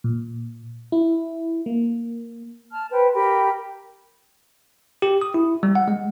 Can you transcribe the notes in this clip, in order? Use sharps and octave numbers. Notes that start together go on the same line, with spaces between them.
A#2
E4
A#3
A5 F6
B4 C5 G5
G4 A#4 G5 B5
G4
D#6
E4
G3
F#5
G#3